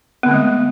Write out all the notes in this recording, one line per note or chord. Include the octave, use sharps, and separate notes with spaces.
D3 G#3 A3 B3 C4